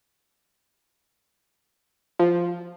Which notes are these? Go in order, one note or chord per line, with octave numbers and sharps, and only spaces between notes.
F3